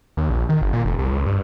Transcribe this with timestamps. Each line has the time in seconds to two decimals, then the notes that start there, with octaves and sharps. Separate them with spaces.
0.17 D#2
0.30 A#1
0.49 D#3
0.62 G1
0.73 A#2
0.85 F1
0.99 C2
1.12 C#2
1.26 G2